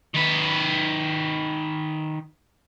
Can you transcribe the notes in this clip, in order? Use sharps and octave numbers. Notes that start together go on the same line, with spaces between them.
D#3 B4